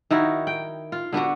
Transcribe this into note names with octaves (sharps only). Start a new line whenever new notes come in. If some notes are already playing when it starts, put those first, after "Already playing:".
D#3 D#4 E4 F#4
G5
F4
D3 B3 D4 F#4